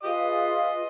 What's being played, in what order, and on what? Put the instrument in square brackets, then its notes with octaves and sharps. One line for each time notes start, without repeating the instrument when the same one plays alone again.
[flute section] F4 G#4 B4 F5 [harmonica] G4 D#5